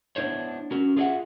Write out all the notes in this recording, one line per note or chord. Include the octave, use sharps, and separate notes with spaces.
B3 D4 E4 C5 C#5
C#4 F#4 A#4
F4 G#4 A#4 D5 E5 F#5